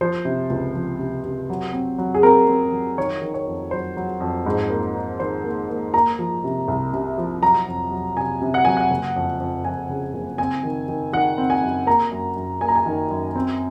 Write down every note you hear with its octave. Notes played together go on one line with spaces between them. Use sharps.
F3 C5
C3
C#2
F3
C3
C3
F#3
C4
F#3
G#4
C4 A#4
C4
F#3
D#3 C#5
D#3
C#5
F2
F#3 C5
F#3
F2
G#2
A#3
D#4
D#3 C5
A#3
A#3
A#3 A#5
F3
C3
C2
C3
F3
F#3 A#5
F2
F#3
C3 G#5
C3
F#5
F#3 G#5
F#5
F#1
F2
F2
F2 G#5
C#3
F#1
C4 G#5
D#3
D#3
D#3 F#5
C4
G#5
F#2
A#3 A#5
F#2
F#2
A#3 G#5
A#5
G#5
D#3
F#2
C4